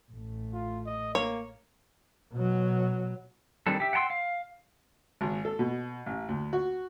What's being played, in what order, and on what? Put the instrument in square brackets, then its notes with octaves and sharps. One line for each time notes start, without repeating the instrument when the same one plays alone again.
[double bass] A1 A3
[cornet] F4
D#5
[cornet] A#3 [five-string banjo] C#5
[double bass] B2 F#3
[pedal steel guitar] D#3 G3 C4 D4 A4
G4 E5
F#5 G5 A5 C6 E6
F5
[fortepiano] G#1
A4
B2
A1
D2
F#4